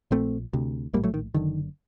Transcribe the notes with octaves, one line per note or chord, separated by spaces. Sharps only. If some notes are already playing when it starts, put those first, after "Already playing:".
A#1 A#2 A3 C4
D2 C3
A#1 A2 G3 A#3
F#3 A3
D#3
F#1 F#2 D3 D#3